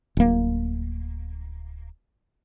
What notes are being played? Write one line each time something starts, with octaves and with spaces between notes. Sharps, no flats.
D1 A#3